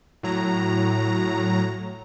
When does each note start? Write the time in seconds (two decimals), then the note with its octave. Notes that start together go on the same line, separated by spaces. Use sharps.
0.23 A2 F#3 A#5